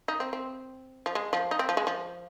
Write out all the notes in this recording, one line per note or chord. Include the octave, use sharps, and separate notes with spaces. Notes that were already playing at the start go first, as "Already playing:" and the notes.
D#4
C4
C4
F3
G#3
F3
D#4
C4
F3
G#3
F3